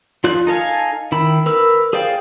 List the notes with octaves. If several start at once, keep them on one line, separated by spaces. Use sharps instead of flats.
F3 F4 D5 F#6
D#4 A4 F5 G#5
D#3 E4 B5
A#4 B4 E6
G#4 C5 D5 F5 G5